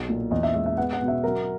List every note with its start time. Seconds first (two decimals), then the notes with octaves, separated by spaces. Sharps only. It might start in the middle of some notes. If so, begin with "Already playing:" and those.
Already playing: B1
0.09 A#2
0.31 E2 D#5
0.43 E5
0.54 G#3 E5
0.66 E5
0.77 B3 F#5
0.93 F#5
1.01 B2
1.08 E5
1.24 F#3 A#4